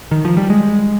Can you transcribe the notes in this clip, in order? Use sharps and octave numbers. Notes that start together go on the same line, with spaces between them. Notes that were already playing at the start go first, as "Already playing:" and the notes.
D#3
F3
G3
G#3